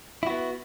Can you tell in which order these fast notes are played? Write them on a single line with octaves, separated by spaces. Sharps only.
E4 F#4 B3